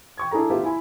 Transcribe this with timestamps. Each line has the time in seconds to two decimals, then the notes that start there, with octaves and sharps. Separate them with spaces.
0.17 G5 C#6 G#6
0.31 D4 E4 G#4 A4 A#5
0.50 B3 F4 G4 E5
0.63 E4 G#5 B5